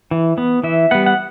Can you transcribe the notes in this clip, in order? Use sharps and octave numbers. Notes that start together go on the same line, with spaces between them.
E3
B3
E3 E5
G3 B3 F#5
F#5